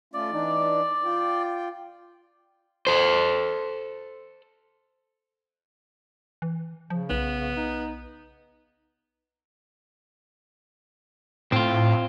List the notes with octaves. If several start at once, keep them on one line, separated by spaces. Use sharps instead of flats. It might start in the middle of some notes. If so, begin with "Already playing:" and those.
A3 C#4 F4 D5
E3 D4 D#4
F4 G5
A4 C5
E3
C#3 F3
B1 B3
D#4
A2 C4 F4